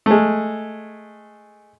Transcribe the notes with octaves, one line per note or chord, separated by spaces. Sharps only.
G#3 A3